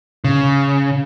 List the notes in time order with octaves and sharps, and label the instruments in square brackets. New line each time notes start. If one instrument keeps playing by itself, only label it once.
[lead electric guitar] C#3